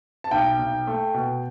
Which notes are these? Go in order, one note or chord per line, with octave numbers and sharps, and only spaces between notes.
A5
B1 G5
B1
A3
B2